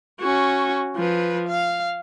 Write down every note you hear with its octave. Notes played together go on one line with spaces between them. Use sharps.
C#4 F#4
F3 B4
F5